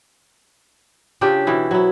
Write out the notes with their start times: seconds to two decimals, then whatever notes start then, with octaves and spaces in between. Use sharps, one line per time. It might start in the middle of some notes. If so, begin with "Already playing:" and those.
1.21 C#3 D4 F4 G4
1.47 B2 E3 E4
1.71 F#3 E4